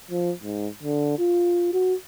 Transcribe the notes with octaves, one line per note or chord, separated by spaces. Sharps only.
F3
G#2
D3
F4
F#4